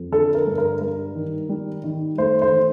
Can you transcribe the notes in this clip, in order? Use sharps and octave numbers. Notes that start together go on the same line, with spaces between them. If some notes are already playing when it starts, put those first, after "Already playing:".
Already playing: F2
D3 A4
A#4
G2
A#4
G3 A#4
D#3
G3
D#3
A3 C5
C5
D#3